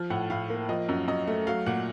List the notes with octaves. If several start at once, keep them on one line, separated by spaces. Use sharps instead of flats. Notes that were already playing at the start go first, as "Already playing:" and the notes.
Already playing: F3 F6
A2 F#5
A2 F5
A#3
F3 D#5
F#2
F#2 D#5
A3
F#3 F5
A#2 F#5